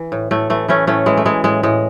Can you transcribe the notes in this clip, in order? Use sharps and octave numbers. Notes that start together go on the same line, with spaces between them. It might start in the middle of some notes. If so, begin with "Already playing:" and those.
Already playing: E3
A2
A2 A3
E3 A3
E3 A3 C#4
A2 A3 C#4
E3 G#3
A3
E3 G#3
A2 G#3
A2 G#3